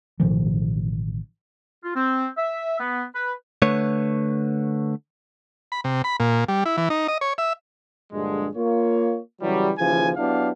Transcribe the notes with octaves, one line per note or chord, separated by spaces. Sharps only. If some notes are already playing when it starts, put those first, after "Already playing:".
A1 B2 D#3 F3
F4
C4
E5
B3
B4
D3 A3 B4 C#5
B5
C3
B5
A#2
G3
E4
E3
D#4
D#5
C#5
E5
A#1 G2 D3 G#3
A#3 F4 C#5
C#3 E3 F#3 G3
D#2 C#3 E3 F3 G#5
F#3 B3 D4 E4 G4 F5